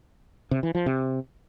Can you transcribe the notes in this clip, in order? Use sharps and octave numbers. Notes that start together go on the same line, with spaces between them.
C3
E3
F3
C3